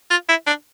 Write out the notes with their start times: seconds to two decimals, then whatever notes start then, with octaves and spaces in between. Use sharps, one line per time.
0.11 F4
0.29 E4
0.47 D4